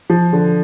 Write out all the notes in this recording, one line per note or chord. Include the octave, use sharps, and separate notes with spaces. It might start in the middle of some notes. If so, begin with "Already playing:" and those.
F3
D3